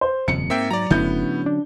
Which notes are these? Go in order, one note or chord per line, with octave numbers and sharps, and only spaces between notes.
C5
D#1 F2 C#3 C#7
G#2 A#3 C4 E5 G5
F#3 D5 A#5
F#1 A2 D3 F#3 B3 C#4 G6
D4